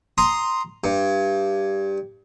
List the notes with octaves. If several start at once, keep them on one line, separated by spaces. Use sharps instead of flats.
A#5 C6 D#6
G2